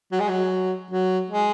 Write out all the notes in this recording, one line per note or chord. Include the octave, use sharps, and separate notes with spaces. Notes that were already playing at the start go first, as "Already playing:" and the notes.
F#3
G#3
F#3
F#3
G#3